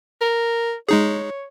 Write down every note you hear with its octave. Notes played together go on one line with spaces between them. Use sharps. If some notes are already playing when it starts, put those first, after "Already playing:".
A#4
G#3 D#4 G#4 C#5